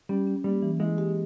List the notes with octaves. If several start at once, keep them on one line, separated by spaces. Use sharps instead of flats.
G3 C#4
C#4
G3 A#3
E3
G#3 E4
G4